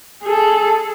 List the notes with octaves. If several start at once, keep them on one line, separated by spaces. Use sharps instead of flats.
G#4 A4